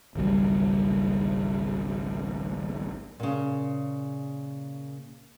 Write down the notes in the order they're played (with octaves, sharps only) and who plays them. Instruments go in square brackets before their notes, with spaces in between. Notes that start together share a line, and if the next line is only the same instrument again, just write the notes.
[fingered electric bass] G#1 C#2 F#3 G3
[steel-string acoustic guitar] A#2 C#3